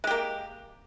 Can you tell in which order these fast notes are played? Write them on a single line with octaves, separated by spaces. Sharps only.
G#3 G4 A#3